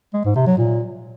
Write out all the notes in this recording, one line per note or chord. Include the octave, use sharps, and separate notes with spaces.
G#3
G#2
C3
F#3
A#2